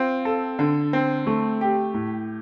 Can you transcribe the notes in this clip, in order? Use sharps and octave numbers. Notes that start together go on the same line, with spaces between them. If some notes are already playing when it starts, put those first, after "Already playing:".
Already playing: C4 F4
A4
D3
C4
A3
G4
A2